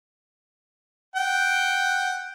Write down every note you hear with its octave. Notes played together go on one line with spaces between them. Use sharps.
F#5 G5